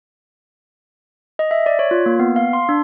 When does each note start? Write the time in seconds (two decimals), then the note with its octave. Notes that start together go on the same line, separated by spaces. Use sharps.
1.39 D#5
1.51 E5
1.66 D5
1.79 C#5
1.91 F4
2.06 A#3
2.19 B3
2.36 F5
2.53 C6
2.69 D4